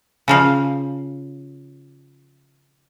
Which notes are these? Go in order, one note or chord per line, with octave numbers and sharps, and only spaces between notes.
C#3 F3 F5